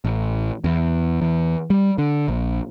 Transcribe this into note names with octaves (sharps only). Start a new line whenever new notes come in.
A1
E2
E2
G3
D3
A#1